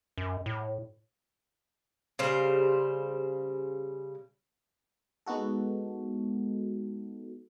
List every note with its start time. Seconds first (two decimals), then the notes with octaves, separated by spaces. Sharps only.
0.18 F#2
0.46 A2
2.19 C#3 G3 C5
5.26 G#3 B3 D#4 F#4 A4